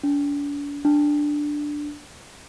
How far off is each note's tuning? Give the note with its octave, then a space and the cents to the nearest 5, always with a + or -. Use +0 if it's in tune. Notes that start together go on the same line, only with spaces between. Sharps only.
D4 -40
D4 +5